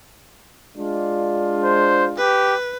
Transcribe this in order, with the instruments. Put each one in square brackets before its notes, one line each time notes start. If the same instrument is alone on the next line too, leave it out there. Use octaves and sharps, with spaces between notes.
[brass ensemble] G#3 D4 F4
[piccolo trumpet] C5
[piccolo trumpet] G4 [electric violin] B4